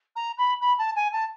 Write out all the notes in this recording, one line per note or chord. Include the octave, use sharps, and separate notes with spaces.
A#5
B5
B5
A5
G#5
A5